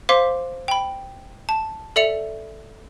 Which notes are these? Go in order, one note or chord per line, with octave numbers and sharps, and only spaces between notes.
C5 F5 C6 D6 B6
G5 B5
A5
A4 D5 E5 C#7 F7